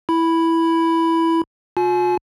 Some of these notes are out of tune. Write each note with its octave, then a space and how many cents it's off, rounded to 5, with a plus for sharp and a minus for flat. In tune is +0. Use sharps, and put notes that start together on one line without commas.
E4 +0 B5 +0
F4 +45 G#5 +40